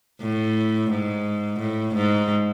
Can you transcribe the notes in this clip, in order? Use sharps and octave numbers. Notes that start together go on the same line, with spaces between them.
A2
G#2
A2
G#2